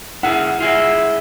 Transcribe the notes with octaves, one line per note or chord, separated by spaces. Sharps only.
E4 G#4 A#4 F#5
E4 F4 G#4 D#5